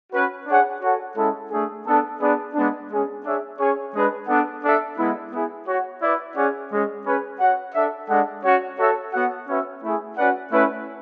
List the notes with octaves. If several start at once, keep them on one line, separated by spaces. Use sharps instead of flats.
C#4 F#4 B4
D4 G#4 C#5 F#5
F#4 A4 C#5 F#5
G#3 C#4 E4 A4
A3 D4 G#4
B3 D4 A4
B3 D4 G#4 B4 D5
G#3 B3 D4
G#3 C#4 G#4
D4 G#4 C#5 E5
C#4 G#4 C#5
G#3 D4 G#4 B4
B3 D4 A4 D5 F#5
D4 A4 E5
G#3 B3 E4
B3 E4 G#4
F#4 C#5 F#5
E4 B4 D5
C#4 G#4 D5 F#5
G#3 C#4 G#4
C#4 G#4 B4
F#4 C#5 F#5
D4 A4 E5
G#3 D4 A4 D5 F#5
C#4 F#4 C#5 F#5
F#4 A4 C#5 E5
B3 F#4 C#5 F#5
C#4 F#4 B4 E5
A3 E4 G#4
C#4 F#4 B4 D5 F#5
A3 C#4 E4 B4